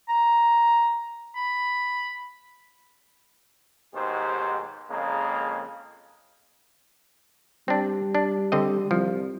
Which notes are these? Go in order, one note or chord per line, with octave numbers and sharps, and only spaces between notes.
A#5
B5
D#2 G#2 B2 G4 C5
F2 C#3 G#3 A#3
G3 C4 D4
D4
D3 C4 D#5
C2 F3